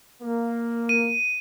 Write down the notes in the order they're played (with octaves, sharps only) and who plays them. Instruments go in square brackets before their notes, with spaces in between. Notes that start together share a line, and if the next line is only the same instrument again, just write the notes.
[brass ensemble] A#3
[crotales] D#7